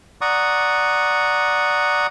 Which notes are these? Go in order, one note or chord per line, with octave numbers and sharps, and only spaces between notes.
D5 F#5 A#5 C#6 D#6